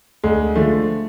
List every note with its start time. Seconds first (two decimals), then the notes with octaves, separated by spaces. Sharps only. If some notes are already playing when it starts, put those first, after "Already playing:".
0.24 D2 G#3
0.55 D3 F3 A3